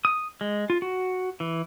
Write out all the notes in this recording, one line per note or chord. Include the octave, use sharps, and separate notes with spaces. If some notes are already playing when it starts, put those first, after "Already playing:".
D#6
G#3
F4
F#4
E3